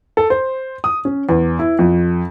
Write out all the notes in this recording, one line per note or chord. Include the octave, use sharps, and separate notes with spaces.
A4
C5
D#6
C#4
E2
E4
F2